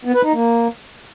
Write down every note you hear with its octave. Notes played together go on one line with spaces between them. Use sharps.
B3
B4
D#4
A#3